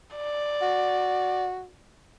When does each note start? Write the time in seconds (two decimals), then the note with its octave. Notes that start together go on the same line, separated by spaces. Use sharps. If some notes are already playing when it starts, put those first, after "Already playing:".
0.16 D5
0.62 F#4